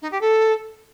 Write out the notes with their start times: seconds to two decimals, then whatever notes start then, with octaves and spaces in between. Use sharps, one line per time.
0.02 D#4
0.11 G4
0.21 A4